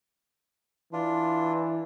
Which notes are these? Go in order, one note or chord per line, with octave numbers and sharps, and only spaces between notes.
E3 D4 F4